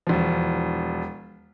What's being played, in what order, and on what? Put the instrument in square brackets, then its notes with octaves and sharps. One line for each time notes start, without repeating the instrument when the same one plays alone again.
[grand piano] E1 F3